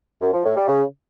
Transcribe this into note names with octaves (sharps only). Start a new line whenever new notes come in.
F#2
F3
A2
G3
C#3